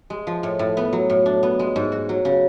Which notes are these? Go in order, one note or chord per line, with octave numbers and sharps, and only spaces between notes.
G#3
F3
A2
A2
B3
F#3
A2
D4
B3
G#3
G#2
F#4
F#3
C#3